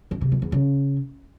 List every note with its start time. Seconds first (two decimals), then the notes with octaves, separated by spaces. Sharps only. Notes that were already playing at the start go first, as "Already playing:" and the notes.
0.11 D#3
0.21 C3
0.32 F2
0.42 E2
0.52 C#3